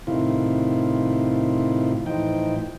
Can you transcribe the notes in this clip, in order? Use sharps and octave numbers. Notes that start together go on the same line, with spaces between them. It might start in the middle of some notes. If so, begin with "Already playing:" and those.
A2 C3 D#3 E4 F4
A2 E3 F3 D#4 G5